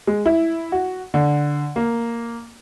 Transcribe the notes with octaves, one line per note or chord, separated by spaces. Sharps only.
G#3
E4
F#4
D3
A#3